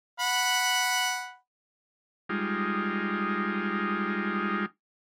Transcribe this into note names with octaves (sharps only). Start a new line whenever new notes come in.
F#5 B5
G3 G#3 D#4 F4